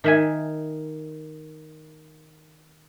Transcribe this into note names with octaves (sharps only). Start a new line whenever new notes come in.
D#3 E5 G#5